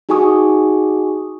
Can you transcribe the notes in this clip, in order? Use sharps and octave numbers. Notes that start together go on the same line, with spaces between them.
D#4 F#4 G#4 G#5 C#6 D#6